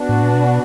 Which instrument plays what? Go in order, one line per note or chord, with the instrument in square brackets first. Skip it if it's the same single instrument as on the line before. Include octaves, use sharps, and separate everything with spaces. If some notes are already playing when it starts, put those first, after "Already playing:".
Already playing: [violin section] B3 D4 F#4
[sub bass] A2
A#2
B2